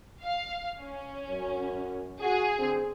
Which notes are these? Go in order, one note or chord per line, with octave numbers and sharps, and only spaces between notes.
F5
C#4
F#2
F#4 G#4
D3 C4